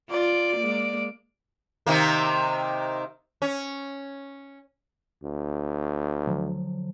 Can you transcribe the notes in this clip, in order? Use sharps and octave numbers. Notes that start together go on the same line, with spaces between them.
F4 D5
G#3 A#3
C3 D#3 A#3
C#4
D2
D3 F3 F#3